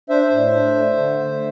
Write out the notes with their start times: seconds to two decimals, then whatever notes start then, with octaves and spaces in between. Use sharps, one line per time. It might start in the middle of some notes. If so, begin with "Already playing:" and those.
0.09 D4 C5 E5
0.31 A2
0.54 D4
0.76 A3
0.97 D3
1.19 D3